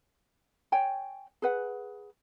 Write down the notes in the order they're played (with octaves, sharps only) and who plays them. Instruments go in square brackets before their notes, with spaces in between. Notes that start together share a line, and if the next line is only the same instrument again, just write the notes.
[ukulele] C#5 G5 G#5
G#4 B4 F#5